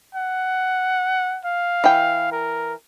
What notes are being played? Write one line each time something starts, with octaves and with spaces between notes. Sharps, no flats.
F#5
F5
E3 G5
A#4